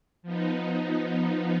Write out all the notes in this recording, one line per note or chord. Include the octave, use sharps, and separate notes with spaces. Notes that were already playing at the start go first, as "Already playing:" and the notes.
F3 B3 D#4